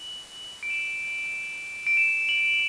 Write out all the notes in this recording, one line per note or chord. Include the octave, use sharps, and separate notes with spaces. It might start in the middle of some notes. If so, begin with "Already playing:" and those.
Already playing: F#7
D7
E7
D7
E7
F#7